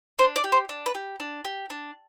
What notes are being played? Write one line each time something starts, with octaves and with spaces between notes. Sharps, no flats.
D4 C5
D5
G4
C5
D4
B4
G4
D4
G4
D4